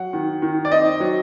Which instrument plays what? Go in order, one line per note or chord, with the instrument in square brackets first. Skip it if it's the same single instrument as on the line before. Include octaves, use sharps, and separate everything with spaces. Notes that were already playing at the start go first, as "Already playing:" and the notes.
Already playing: [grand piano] F#3 F#5
D#3
D#3
D5
C4 D#5
F#3